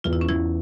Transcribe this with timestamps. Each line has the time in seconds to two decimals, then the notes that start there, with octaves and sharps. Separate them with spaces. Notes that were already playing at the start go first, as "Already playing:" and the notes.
0.04 E2 F4
0.13 E4
0.21 C#4
0.28 E2 E3 E4